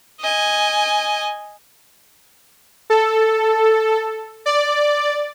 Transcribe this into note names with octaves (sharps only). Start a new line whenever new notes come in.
D#5 G#5
A4
D5